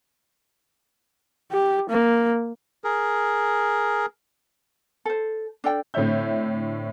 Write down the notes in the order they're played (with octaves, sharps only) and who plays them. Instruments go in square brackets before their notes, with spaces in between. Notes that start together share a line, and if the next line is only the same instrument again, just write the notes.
[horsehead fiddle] G4
A#3
[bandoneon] G#4 A#4
[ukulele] A4 C5
D4 A4 D5 G5
[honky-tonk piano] A2 D3 C4 C#5 E5 G6